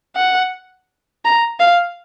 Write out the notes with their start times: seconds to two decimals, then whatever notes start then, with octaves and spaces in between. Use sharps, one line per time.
0.16 F#5
1.25 A#5
1.60 F5